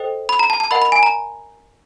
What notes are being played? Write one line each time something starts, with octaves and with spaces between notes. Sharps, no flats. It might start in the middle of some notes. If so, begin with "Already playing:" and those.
Already playing: A4 C5 D#5 G5
B5
A#5
A5
A5
A#4 D#5 F#5 B5
B5
G#5
A#5